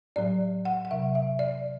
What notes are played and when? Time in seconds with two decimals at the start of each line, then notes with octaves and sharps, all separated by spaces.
0.16 A2 F#3 D5
0.65 F#5
0.85 F#5
0.90 E2 C3 F#3 E5
1.15 E5
1.39 D5